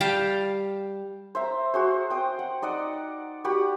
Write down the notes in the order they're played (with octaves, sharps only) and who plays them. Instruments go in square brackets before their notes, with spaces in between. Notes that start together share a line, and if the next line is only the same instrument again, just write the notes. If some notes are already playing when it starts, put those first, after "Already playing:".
[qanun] G3 F5 G5 A5
[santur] C5 E5 A#5
F#4 G#4 C5
G5 D#6
F#5
D#4 D5 D#5 F#5
F#4 G4 F#5 B5